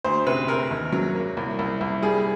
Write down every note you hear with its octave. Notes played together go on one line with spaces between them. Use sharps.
D2 C5
C3 B4
C3 A#4
D#2
F#3
A#3
C2
C2
C2
G3 G#4